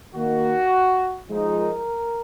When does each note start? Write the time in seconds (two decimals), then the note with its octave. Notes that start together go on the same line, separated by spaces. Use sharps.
0.15 D#3 A#3 D#4 F#4
1.30 F3 G#3 D#4
1.58 A#4